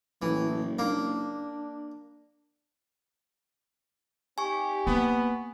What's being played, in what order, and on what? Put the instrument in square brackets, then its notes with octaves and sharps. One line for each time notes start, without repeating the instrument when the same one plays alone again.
[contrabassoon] F#1 [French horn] A2 [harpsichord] E3
[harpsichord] A#3 [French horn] D4
[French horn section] C4 D#4 G4 [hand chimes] G#5 C#6
[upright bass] A#3 [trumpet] B3